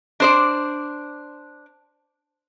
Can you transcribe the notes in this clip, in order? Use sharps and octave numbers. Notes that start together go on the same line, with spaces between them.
D4 C5 D5